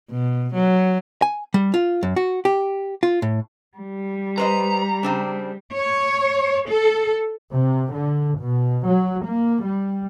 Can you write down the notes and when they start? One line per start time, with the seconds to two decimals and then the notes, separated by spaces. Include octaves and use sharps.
0.11 B2
0.54 F#3
1.22 G#5
1.54 G3
1.74 F4
2.03 F#2
2.16 F#4
2.45 G4
3.03 F4
3.22 A2
3.77 G3
4.38 B4 C5 D#5 A#5
5.03 C#3 C4 D4
5.76 C#5
6.68 A4
7.52 C3
7.93 D3
8.38 B2
8.86 F#3
9.23 A#3
9.64 G3